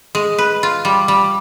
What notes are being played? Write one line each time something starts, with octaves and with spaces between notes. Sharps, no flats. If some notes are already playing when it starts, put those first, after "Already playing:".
G#3
B4
F4
G3
G3